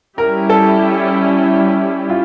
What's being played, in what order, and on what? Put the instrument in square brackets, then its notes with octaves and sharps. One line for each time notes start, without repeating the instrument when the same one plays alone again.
[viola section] G3 C#4 E4 G4 [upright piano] A#4
[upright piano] A4
F4